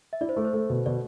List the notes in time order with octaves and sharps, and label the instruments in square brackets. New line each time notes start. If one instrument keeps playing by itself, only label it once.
[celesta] E5
[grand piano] E4 [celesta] D5
[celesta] C5
[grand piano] A3 [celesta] A4
[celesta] C5
[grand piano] A3
B2
[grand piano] B2 [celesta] D5